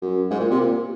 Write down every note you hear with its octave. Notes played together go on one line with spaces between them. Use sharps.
F#2
G#2
A#2
C3
A#2